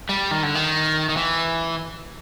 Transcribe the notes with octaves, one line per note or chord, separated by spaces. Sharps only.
G3
D#3
D3
D#3
D#3
E3